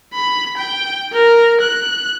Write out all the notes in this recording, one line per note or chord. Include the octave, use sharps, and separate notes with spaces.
B5
G5
A#4
F#6